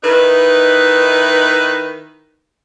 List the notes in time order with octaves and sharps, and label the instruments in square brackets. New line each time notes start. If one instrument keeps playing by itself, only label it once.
[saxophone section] D#3 D#4 E4 B4